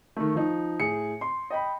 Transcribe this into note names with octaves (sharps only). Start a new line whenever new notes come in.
D#3 A3
F3 D#4
A2 G#4 C#7
C6
D#5 G5 B5